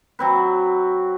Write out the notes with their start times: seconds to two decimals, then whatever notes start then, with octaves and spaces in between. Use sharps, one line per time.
0.19 F#3 C4 B4